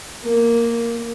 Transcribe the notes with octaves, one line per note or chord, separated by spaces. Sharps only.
A#3